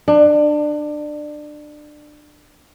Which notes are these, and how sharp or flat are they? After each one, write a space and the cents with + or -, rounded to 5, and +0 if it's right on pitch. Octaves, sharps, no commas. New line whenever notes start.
D4 +25